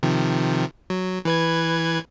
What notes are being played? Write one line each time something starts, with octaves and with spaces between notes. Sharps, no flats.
C3 D#3 F3
F#3
E3 B4 G#6